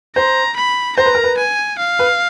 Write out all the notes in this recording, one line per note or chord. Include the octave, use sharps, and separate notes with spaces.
C5 A#5
B5
C5 A#5
B4
A#4
B4
G#5
F5
B4